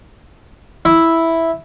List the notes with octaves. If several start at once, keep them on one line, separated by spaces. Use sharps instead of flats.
E4